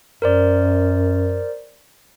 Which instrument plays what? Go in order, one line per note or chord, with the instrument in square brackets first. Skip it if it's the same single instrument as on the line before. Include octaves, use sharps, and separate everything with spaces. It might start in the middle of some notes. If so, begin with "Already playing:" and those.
[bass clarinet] F#2 [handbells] A#4 C5 D5